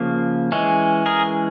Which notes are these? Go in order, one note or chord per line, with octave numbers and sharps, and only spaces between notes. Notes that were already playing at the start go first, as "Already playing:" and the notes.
Already playing: C#3 F3 A#3
E3 G#3 C#4
G#4 A#4